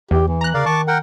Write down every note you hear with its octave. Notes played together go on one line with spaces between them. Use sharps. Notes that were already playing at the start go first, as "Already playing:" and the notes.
E2 G4
E3
A#5 F#6
C#3 A#4 D5 F5
D#3 A5 C#6 D6
A#4 F#5 G5